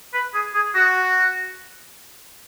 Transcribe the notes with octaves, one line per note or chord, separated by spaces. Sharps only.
B4
G#4
G#4
F#4